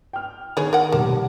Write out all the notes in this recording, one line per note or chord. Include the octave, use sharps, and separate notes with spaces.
G5 F6
D#3 B3 G#4 C#5
A#4 F#5
F1 B1 G3 A#3